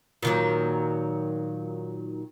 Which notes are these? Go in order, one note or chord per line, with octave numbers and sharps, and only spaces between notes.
A#2 D#3 F#3